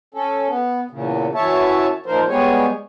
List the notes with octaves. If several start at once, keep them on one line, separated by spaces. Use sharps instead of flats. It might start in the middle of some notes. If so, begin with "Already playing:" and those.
C#4 A4
B3
E2 A#2 C#3
F#2 E3 C#5 E5 A5
A#2 D#3 F3 A#4 C5
G3 G#3 B3 G#4 C#5